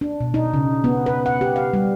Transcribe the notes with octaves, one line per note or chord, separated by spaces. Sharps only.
D4
B2
D#4
C#3
B3
B4
F#5
G4
F5
G3